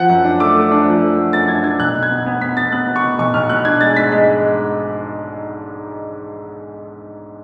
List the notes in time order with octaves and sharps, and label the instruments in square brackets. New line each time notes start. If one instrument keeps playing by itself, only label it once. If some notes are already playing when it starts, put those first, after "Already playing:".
Already playing: [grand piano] F3 F#5
F#2
D4
A3 D6
A3
D4
F3
A3
A3
F#2 A6
D4 G#6
D4 G#6
B1 F#6
B2
G#6
B3
B3
B3 B6
B3 A6
B3 F#6
B3
C#6
B2
B1 C#6
B1 F6
B2 F#6
D4 G#6
G#3 A6
G#2 B6
G#3